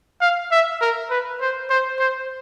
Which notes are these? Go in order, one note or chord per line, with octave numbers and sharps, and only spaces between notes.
F5
E5
A#4
B4
C5
C5
C5